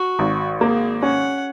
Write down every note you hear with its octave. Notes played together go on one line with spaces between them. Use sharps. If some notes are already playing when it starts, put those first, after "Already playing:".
Already playing: F#4
G#1
A#3 G#4
C#4 F#5